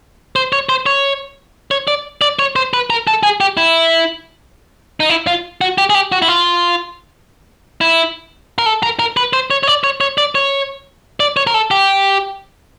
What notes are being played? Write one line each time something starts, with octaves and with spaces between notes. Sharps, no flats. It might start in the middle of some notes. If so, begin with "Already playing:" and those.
C5
C#5
C5
C#5
C#5
D5
D5
C#5
C5
B4
A#4
A4
G#4
G4
E4
D#4
E4
F4
F#4
G4
G#4
G4
F#4
E4
F4
E4
A#4
A4
A#4
A#4
B4
C5
C#5
C#5
D5
C#5
C#5
D5
C#5
D5
C#5
A#4
A4
G4